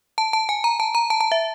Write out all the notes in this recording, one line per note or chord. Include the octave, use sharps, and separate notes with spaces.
A5
A5
G#5
A#5
A5
A#5
A5
A5
E5